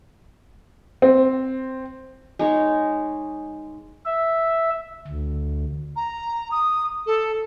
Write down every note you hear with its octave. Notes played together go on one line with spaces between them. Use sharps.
C4
G#3 D#4 C#5
E5
D2
A#5
D#6
A4